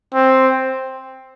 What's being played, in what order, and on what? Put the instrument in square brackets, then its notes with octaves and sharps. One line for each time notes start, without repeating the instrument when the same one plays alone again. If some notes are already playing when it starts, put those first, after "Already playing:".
[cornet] C4